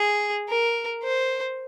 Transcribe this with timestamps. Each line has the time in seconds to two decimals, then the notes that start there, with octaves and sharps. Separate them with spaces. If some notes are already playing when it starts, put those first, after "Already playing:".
Already playing: G#4
0.49 A#4
1.03 C5